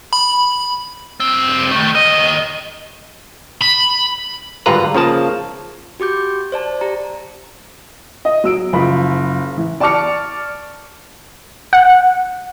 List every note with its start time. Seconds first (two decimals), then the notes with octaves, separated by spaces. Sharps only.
0.13 B5
1.20 G2 C4
1.71 D#3 A3
1.95 D#2 D#5
3.62 B5
4.66 G#1 G2 D3 F4 B4 A#5
4.95 C#3 F3 A#3 A5
6.00 F#4 G4 D6 G6
6.52 C5 D5 A5
6.81 G4 A#5
8.25 D#5
8.44 F#3 E6 D7
8.73 F#1 F3 B5
9.57 E3
9.80 D5 A5 C#6 D6 F6 C#7
11.73 F#5